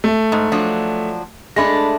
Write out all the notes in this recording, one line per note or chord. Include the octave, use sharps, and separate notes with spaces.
A3
G#2
F3 F#3 D4
G#3 A3 D4 B5 A#6